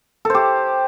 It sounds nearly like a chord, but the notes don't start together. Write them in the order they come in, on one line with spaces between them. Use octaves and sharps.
A4 C5 G4